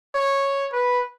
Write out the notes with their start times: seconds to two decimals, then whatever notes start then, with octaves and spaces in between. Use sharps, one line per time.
0.15 C#5
0.73 B4